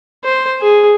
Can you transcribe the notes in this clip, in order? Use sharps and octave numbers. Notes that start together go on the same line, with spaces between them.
C5
G#4